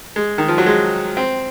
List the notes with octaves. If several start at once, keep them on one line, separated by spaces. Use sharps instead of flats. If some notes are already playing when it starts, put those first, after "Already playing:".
G#3
D#3
F3
F#3
G#3
C4